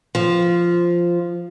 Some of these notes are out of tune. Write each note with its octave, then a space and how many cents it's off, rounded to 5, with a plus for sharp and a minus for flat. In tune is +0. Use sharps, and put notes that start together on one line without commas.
F3 -10